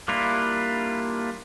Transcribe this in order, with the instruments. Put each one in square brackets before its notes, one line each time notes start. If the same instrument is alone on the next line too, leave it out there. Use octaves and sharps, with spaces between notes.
[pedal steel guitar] G3 A#3 D4 E4 F4